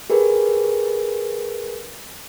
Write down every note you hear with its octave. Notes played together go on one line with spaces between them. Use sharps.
G4 G#4 A#4 B4